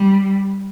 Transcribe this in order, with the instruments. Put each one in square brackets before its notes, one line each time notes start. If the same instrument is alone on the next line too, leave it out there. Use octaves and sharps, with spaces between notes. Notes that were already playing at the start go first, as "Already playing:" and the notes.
Already playing: [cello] G3